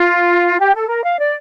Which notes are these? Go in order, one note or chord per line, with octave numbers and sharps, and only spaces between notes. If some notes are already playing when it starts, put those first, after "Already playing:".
Already playing: F4
G4
A4
A#4
F5
D5